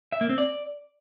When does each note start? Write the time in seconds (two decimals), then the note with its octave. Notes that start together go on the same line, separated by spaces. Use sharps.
0.12 E5
0.21 A#3
0.29 C4
0.38 D5